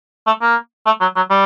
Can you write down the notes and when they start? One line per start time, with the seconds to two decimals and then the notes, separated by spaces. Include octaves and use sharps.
0.27 A3
0.42 A#3
0.86 A3
1.01 F#3
1.16 F#3
1.31 G3